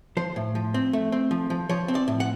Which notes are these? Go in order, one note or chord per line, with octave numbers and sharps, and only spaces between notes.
F3 C5
A2
F3
C4
A3
C4
F3
F3
F3 C#5
C4
D5
A2
F#5